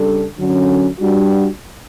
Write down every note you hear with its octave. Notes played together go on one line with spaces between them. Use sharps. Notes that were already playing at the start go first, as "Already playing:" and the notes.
Already playing: C#3 G3 D4 A4
D3 F#3 C#4
G3 D4 F#4